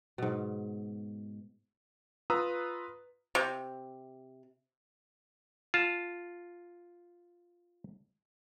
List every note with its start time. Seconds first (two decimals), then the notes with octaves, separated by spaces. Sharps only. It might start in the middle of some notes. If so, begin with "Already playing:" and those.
0.18 G#2 B2
2.30 F4 B4 A#5 D#6 E6
3.35 C3
5.74 F4 A5